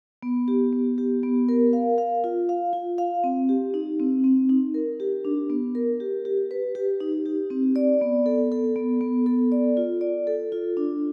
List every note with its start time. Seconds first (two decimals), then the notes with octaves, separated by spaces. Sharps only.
0.23 B3
0.48 G4
0.73 B3
0.98 G4
1.23 B3
1.49 A#4
1.73 F5
1.98 F5
2.24 F4
2.49 F5
2.73 F4
2.98 F5
3.24 C4
3.49 G4
3.74 D#4
3.99 C4
4.24 C4
4.49 D#4
4.74 A#4
5.00 G4
5.25 D4
5.50 B3
5.75 A#4
6.00 G4
6.25 G4
6.51 B4
6.75 G4
7.00 D#4
7.26 G4
7.50 C4
7.76 D5
8.01 B3
8.26 A4
8.52 A4
8.76 B3
9.01 B3
9.26 A4
9.52 D5
9.77 F4
10.01 D5
10.27 A4
10.52 F4
10.77 D4